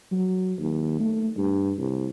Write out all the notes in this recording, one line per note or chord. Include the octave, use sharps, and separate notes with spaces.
F#3
D#2
A3
G2
C2